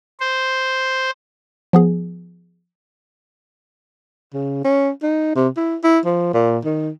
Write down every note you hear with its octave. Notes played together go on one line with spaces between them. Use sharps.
C5
F3 B3 G#4
C#3
C#4
D#4
C3
E4
E4
F3
A#2
D#3